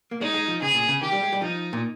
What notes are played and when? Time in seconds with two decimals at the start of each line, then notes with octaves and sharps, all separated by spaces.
0.11 A#3
0.21 G#3 D#4
0.34 G#3
0.48 F3
0.62 C#3 G#4
0.74 A#2
0.88 C#3
1.02 D#3 G4
1.12 G3
1.22 G#3
1.33 G3
1.42 F3 D#4
1.73 A#2